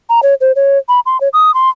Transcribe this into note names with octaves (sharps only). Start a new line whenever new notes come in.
A#5
C#5
C5
C#5
B5
C6
C#5
D#6
C6